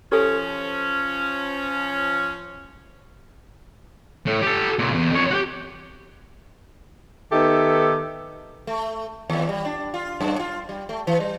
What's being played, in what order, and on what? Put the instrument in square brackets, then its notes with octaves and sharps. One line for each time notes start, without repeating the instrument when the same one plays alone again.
[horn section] F3 C#4 [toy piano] G4 A4 G#5
[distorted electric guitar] A2
G4 A4
A#2 C#3
E2
F2 C#5
F#4 G4
[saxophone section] D#3 B3 D#4 G4 A4 E5
[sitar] A3
D#2
G3
D4
F4
F#2
F4
G3
A3
E3
G3